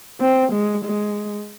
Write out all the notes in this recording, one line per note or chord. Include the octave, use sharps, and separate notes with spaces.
C4
G#3
G#3